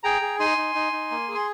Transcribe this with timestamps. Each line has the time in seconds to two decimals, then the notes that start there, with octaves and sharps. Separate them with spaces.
0.04 G#4 G5 A#5
0.21 G#4
0.40 D#4 G#5 C6
0.58 D#4
0.75 D#4
0.93 D#4
1.11 A#3
1.28 G#4
1.35 C6